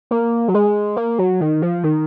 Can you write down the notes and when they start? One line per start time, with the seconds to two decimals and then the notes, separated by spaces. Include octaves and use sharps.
0.11 A#3
0.48 F#3
0.54 G#3
0.97 A#3
1.19 F#3
1.41 D#3
1.62 F3
1.83 D#3